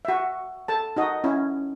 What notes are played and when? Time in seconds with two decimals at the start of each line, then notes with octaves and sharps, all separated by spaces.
0.05 F#4 E5
0.68 A4 A5
0.96 D#4 F#4 D#5
1.24 C#4 E4